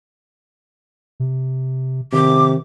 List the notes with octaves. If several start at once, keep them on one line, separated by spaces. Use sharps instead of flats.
C3
C3 D#3 D6